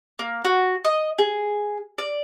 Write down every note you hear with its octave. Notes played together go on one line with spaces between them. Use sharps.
A#3
F#4
D#5
G#4
D5